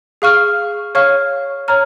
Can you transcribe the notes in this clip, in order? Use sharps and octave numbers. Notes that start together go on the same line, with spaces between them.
G#4 F5 C#6 F6
C#5 F5 C#6 F6
C#5 A#5 F6